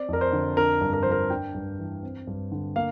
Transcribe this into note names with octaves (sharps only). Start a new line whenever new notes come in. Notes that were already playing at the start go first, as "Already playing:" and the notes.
Already playing: C4 D5
F2 A#4
C5
D3
D4 A#4
G2
A#4
F3 C5
A#4
D4 G5
G2
E3
C4
G2
D3
A#3 F5